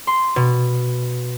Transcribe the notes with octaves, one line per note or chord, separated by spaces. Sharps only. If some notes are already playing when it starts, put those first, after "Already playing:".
C6
B2